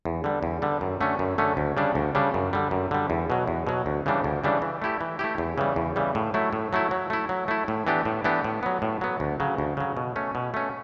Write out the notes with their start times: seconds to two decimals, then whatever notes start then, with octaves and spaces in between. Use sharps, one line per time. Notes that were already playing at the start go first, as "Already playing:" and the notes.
0.05 E2
0.24 D3 G3
0.43 E2
0.62 D3 G3
0.81 F#2
1.01 D3 A3 C#4
1.19 F#2
1.38 D3 A3 C#4
1.57 D2
1.77 C#3 G3 D4
1.95 D2
2.15 C#3 G3 D4
2.34 F#2
2.53 D3 G3
2.71 F#2
2.91 D3 G3
3.10 E2
3.30 B2 F#3
3.47 E2
3.67 B2 F#3
3.86 D2
4.06 C#3 E3 G3 D4
4.24 D2
4.44 C#3 E3 G3 D4
4.62 E3
4.82 A3 E4 G4
5.01 E3
5.19 A3 E4 G4
5.38 E2
5.58 C#3 E3 G3
5.76 E2
5.96 C#3 E3 G3
6.15 A2
6.34 F#3 A3 E4
6.53 A2
6.73 F#3 A3 E4
6.91 F#3
7.10 A3 E4
7.29 F#3
7.48 A3 E4
7.68 A2
7.87 E3 B3 D4 G4
8.05 A2
8.24 E3 B3 D4 G4
8.44 A2
8.63 F#3 B3
8.82 A2
9.01 F#3 B3
9.20 D2
9.40 C#3 F#3
9.58 D2
9.77 C#3 F#3
9.97 B2
10.16 A3 C#4
10.35 B2
10.54 A3 C#4